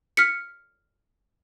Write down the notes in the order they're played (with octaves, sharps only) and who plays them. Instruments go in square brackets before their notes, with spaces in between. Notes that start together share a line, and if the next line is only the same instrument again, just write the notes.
[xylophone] F6 B6 C#7